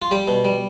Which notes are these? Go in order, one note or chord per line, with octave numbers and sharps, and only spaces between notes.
F4
G3 G4
B2
G3